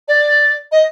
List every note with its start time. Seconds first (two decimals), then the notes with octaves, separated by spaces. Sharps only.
0.08 D5
0.72 D#5